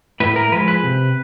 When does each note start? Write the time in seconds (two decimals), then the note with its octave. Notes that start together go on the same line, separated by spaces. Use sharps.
0.20 A2 B4
0.36 A#4
0.52 F3 G#3 B4
0.68 B4
0.83 C3